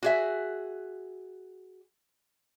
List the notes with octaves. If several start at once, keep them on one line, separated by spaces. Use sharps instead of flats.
F#4 G#4 E5